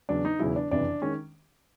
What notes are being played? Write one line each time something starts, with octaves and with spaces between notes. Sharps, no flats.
E2 C#3 F#3 D4
D#4
E1 E2 C#3 F#3 E4
D4
F#1 F2 C3 E3 D4
D#3 G#3 C#4